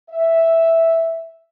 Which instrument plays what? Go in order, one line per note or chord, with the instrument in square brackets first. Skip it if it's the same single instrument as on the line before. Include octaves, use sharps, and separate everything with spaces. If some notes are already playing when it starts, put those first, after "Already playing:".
[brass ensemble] E5